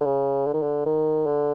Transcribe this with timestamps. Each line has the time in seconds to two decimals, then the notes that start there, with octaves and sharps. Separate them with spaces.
0.01 D3
0.05 C#3
0.46 D3
0.54 D#3
0.62 D3
0.86 D#3
1.26 D3